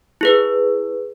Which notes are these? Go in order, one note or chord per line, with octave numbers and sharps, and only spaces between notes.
E4 G#4 B4